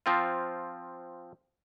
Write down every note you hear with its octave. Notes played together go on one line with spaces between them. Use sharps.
F3 C4 F4